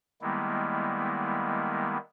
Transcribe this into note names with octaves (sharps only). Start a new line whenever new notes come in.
D#3 G3 G#3 A#3 B3 E4